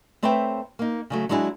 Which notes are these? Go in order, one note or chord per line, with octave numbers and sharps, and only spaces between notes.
A3 C4 B4 C#5 E5 G5
A#3 D#4
C#3 F#3 A3
F#3 G#3 B3 D4 E4 G#4